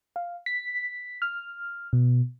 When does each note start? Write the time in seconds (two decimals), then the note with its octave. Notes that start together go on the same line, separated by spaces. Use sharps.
0.16 F5
0.46 B6
1.22 F6
1.93 B2